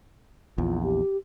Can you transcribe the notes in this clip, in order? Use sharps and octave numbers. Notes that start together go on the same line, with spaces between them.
A#1 E2 F4
G4